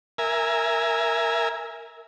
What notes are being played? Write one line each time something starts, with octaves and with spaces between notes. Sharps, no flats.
A#4 E5 G#5